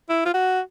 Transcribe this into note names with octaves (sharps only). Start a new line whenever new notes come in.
E4
F4
F#4